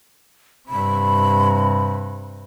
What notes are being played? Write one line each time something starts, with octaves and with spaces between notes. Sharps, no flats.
G2 C3 B5